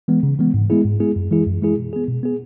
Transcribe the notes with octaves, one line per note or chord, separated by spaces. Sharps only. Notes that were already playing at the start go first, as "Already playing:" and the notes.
E3 G#3 B3
C#3
E3 G#3 B3
G#2
G#3 B3 E4 G#4
G#2
G#3 B3 E4 G#4
F#2
E3 G#3 E4 G#4
F#2
E3 G#3 E4 G#4
B2
B3 G#4
B2
B3 G#4